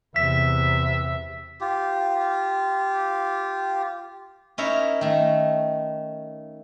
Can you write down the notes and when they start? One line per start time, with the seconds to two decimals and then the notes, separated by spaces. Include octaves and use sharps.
0.16 E2 C3 E5 B6
1.61 F4 G4
4.58 C#4 D#4 E4 A#4 C#5 E5
5.01 D#3 A3